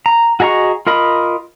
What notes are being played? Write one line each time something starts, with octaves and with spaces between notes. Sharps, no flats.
A#5
F#4 G#4 D#5 A#5 C#6
F4 A#4 D#5 B5